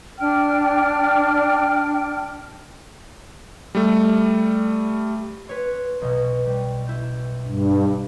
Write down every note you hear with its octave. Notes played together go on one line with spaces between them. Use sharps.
D4 G5 F6
G3 A3
B4 C#5 C6
B1 B2
G3
E4 G6
G2